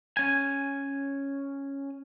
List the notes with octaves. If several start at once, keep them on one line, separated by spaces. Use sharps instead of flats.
C#4 G#5